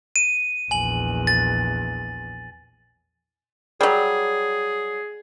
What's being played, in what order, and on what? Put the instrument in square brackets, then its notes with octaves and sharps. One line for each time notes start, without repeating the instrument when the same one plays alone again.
[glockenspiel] D#7
[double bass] A#1 E2 [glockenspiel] G#5 F#7
[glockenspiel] A6
[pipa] F#3 G3 [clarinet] G#4